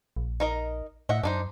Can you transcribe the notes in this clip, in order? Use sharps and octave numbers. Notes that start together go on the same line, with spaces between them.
A#1
D#4 A#4 D#5
A2 D#5 E5 F#5
F#2 D4 D#4 C5